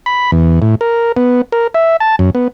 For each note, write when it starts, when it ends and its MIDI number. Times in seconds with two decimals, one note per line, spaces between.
0.06 0.31 83
0.32 0.60 40
0.62 0.75 45
0.81 1.12 70
1.17 1.42 59
1.52 1.67 70
1.74 1.97 76
2.00 2.16 81
2.19 2.30 42
2.35 2.48 59